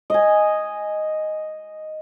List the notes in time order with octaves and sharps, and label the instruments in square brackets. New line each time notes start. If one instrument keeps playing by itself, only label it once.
[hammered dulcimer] D#5 G#5